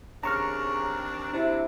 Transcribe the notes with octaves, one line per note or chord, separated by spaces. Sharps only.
D#2 C#3 C4 D4 A#5 C#6 F6
C3 F#3 D4 E4